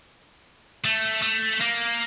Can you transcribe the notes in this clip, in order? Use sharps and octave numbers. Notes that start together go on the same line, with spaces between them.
A3
A3
A#3